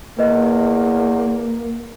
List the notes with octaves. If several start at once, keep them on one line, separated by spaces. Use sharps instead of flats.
E2 A#3 B4 D#5